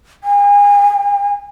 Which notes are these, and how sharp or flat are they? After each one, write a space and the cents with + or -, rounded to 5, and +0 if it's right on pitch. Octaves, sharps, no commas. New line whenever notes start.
G#5 -35